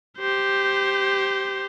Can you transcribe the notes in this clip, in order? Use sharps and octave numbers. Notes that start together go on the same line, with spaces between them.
G4 C5